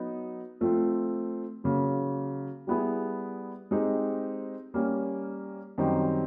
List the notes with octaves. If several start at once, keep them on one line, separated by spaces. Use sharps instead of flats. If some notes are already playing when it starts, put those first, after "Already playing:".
Already playing: F#3 B3 D#4
F3 A3 C4 F4
C#3 F#3 A#3
G3 B3 E4 G#4
G#3 C4 D#4 G4 C5
G3 A#3 C#4
F#2 D#3 G3 C4 D#4